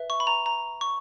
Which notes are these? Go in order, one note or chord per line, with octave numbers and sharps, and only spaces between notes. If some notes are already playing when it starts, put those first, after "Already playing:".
Already playing: B4 E5
C#6
B5
A#5
A#5
C#6